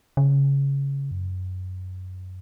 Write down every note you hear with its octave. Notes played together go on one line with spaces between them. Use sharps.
C#3
F#2